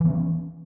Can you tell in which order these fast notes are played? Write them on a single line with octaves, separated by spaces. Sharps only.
E3 B3 C#4